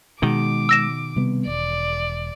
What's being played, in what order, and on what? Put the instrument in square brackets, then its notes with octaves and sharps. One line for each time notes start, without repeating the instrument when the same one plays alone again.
[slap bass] B2 D#3 [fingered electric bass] G#3 [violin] D6
[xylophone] E6 A#6 E7
[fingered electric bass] C3 G3 B3
[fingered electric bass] E1 [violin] D5